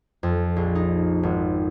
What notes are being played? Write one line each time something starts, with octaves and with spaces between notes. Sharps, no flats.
F2
A#1
D#4
G#1